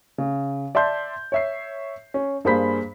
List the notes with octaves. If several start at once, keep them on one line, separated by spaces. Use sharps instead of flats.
C#3
D5 E5 A5 C6 G6
C#5 E5 C7
C#4
G2 A#3 G#4 C5 B5 B6